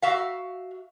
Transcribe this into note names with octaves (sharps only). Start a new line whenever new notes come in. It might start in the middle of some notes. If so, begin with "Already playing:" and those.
F#4 E5 F5